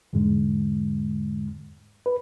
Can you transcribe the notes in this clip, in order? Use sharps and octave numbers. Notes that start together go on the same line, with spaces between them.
E2 G#2 D3 G#3
B4